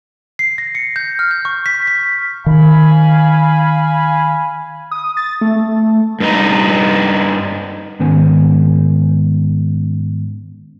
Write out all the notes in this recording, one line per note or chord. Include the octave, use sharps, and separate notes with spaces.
C7
A#6
C#7
G6
F6
G6
C#6
B6
B6
D#3 F5 G#5 B5
D#6
A6
A3
G2 D#4
G#2 D#3 B3 C#4 C5 G#5